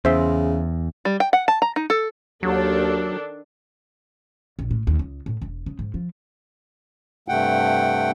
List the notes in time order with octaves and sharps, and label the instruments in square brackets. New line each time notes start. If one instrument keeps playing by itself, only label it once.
[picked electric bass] E2 [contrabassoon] C#3 [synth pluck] C5 E5 C6
[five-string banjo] G3
G5
F#5
A5
A#5
D#4
A4
[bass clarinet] D#2 [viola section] D#3 D4 A4 [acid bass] F#3
[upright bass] A#1
A2
D#2
C#2
A2
E1
C#3
G#2
F3
[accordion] G2 C3 A3 F#5 G5